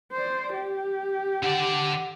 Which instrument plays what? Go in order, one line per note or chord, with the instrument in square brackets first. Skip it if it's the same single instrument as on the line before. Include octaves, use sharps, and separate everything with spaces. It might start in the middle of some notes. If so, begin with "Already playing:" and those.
[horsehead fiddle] C5 D5
G4
[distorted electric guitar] D3 D5 [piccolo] F#5